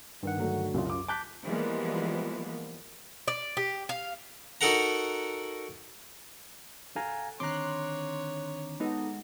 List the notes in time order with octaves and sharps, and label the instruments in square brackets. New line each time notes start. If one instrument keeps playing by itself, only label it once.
[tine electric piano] G2 D#3 F#5
[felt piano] D3 F#3 A3
[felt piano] C2 C#3 [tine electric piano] F#2 F4
[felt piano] D6
[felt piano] A5 F#6 B6 [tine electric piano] D6 G6
[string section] E3 F3 G3 G#3 A#3 B3
[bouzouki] D5
G4
F5
[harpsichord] D#4 F#4 A4 A#4 F#5 A#5
[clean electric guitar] F#4 A4 [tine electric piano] F5 G#5 A#5
[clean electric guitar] D3 D#3 C4 [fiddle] C#5 [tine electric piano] A#5 D6 [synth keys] C6 F#6
[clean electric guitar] G#3 F#4 [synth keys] B3 D#4 A4